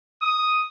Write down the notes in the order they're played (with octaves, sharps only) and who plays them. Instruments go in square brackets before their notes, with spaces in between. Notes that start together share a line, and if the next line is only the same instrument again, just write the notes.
[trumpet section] D#6